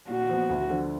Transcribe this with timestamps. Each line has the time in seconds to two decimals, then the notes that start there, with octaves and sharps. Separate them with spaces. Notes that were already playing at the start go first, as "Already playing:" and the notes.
0.09 A#2 F#4
0.29 F3 B3
0.49 D2
0.70 D3 F3